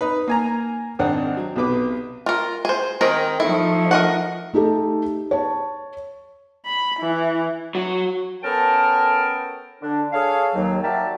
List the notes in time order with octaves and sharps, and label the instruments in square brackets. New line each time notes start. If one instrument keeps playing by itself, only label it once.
[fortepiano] D#4 B4
A#3 G#5 A#5
G#1 D#3 C4 D4 F#5
F#3
B1 C3 B4 D6
[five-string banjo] F4 A#4
G#4 C5
[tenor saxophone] D#3 [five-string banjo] C4 G#4 A#4
[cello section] F3 D#4 [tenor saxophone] A3 [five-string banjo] E4
[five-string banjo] A#4 D#5 F#5
[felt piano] A3 D#4 G4 A4
C#5 A5
[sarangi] B5
E3
[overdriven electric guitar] F#3
[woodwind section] B3 C#4 A4 A#4 G5 A5
D3 D4
G#4 A4 C#5 F5
D#2 F#3
F#4 G4 A#4 D5 E5 A5